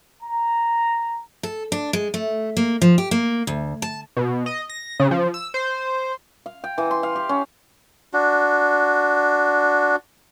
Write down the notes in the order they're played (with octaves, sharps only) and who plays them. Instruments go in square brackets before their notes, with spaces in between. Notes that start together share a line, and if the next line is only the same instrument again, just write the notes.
[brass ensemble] A#5
[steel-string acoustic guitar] A4
D4
G#3
A3
A#3
F3
G4
A#3
D2
A5
[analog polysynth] B2
D#5
A#6
C#3
F3
E6
C5
[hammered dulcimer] F5
G5
E3
C6
F5
G4
C#4
[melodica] D4 F#4